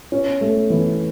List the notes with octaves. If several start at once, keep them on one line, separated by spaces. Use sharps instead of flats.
C#4
A3
E3